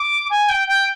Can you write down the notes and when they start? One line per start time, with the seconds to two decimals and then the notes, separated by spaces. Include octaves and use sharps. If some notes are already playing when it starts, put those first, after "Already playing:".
Already playing: D6
0.30 G#5
0.49 G5
0.68 G5